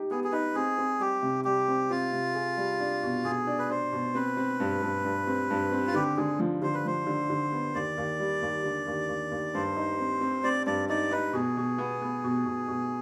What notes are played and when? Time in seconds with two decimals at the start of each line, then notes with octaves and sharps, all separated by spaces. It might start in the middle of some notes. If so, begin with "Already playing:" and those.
Already playing: D#4 G4
0.11 B3 G#4
0.24 G#4
0.32 D#4 B4
0.55 C4 G#4
0.78 C4
1.00 G3 G4
1.23 C3
1.45 G3 G4
1.68 C4
1.90 C4 F4
2.12 C3
2.35 G#4
2.57 G3
2.80 D4
3.03 B2
3.24 B2 G#4
3.47 D4
3.59 B4
3.70 D4 C5
3.93 B2
4.15 C4 B4
4.37 C4
4.60 G2
4.82 G2
5.05 G2
5.27 C4
5.50 G2
5.72 C4
5.87 F4
5.94 D3 G4
6.17 D3 G#4
6.39 F3
6.62 D3 C5
6.74 B4
6.85 F3 C5
7.07 D3
7.30 D3
7.52 B3
7.75 D#2 D5
7.97 D#2
8.19 G3
8.42 D#2
8.64 D3
8.87 D#2
9.09 D#2
9.32 D#2
9.54 G2 C5
9.77 D#4
10.00 C4
10.21 C4
10.44 C4 D5
10.66 G2 D5
10.89 D#4 D5
11.11 D#4 B4
11.33 B2 G#4
11.57 B2
11.78 B3
12.02 B3
12.24 B2
12.46 B2
12.68 B2